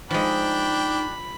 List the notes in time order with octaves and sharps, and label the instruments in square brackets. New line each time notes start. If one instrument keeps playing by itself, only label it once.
[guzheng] F3 G#3 [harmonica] D4 G5 [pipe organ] D#4 [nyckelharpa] B5